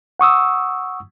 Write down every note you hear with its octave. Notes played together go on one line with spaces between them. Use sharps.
F#5 C#6 D#6 E6